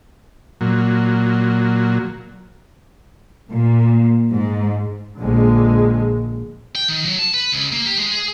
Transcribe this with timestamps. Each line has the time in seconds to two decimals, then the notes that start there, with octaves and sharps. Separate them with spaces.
0.61 A#2 F#3
3.50 A#2
4.30 G#2
5.19 A#1 A#2 D3 G#3
6.75 G5
6.88 D#3
7.05 F#3
7.19 A5
7.34 B4
7.52 C#2
7.72 A#3
7.86 G4
7.98 G#3
8.12 G#4